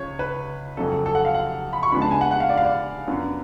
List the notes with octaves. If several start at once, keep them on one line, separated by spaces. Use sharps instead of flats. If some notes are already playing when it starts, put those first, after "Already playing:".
Already playing: C#2 C#3 F3 C#5
B4
F2 C#3 F#3 C#4 A4
A4
A4
F#5
F5
F#5
B5
C#6
C#3 F3 G#3 B3 D4 B5
A5
G#5
F#5
F#5
F5
D5
F5
D5
F#2 F3 B3 D4